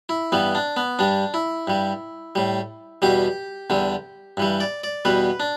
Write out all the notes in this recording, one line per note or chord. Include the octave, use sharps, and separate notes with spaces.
E4
G2 E3 G3 B3
D4
B3
G2 G3 D4
E4
G2 G3
A2 G3
E2 B2 G3 G4
E2 D3 G3
G2 E3 G3
D5
D5
E2 B2 G3 B4
D4